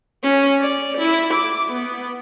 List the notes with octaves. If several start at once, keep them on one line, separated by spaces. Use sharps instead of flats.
C#4
D5
E4
D6
B3